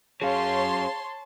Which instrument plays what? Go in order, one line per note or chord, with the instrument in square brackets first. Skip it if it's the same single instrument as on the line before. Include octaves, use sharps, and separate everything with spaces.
[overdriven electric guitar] F#3 C#4 [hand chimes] G#4 F5 [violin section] C#5 C6 [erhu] A5